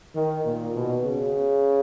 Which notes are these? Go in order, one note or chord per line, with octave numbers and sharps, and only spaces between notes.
D#3
A#2
B2
C#3